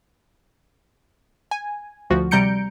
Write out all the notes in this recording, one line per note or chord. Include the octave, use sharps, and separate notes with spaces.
G#5
D2 F3 F#4
C3 G3 A#5 G6 C#7 D7